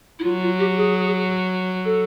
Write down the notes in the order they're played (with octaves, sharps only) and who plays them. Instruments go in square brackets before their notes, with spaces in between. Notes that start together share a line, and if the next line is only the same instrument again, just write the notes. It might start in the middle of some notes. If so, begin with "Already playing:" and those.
[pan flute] E4
[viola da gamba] F#3 [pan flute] F4
[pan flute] F4
G4
G#4
A4